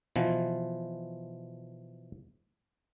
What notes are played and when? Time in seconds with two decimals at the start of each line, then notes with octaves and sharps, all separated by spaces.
0.16 B2 E3 F3